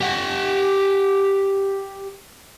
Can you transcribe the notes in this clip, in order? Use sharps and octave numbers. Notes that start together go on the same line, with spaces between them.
G4 F#5